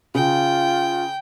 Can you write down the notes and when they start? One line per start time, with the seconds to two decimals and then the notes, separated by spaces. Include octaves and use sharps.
0.15 C#3 F4 G5